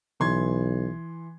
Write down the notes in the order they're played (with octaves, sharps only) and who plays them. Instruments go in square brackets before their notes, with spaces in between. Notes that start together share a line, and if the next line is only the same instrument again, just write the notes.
[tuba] B1 [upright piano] E3 C6 G#6